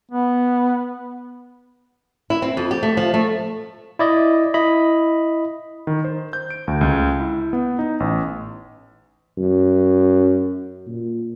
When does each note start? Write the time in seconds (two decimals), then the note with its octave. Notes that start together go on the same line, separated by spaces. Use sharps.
0.11 B3
2.30 E4
2.42 C4
2.57 F2
2.71 G4
2.83 A3
2.97 F3
3.14 A3
3.99 E4 D5 D#5
4.54 E4 D#5 B5
5.87 D#3
6.04 C5
6.33 G6
6.50 D7
6.68 D2
6.81 C#2
7.20 E4
7.53 B3
7.79 D#4
8.00 A1
9.38 F#2
10.87 A#2